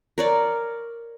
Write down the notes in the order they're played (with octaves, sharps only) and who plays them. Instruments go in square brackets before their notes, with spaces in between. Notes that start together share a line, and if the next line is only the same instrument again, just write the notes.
[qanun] A#4 C#5 D5